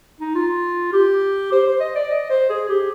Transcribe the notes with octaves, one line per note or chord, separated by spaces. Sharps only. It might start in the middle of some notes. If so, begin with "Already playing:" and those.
D#4
F4
G4
C5
C5
D#5
D5
D#5
C5
G#4
G4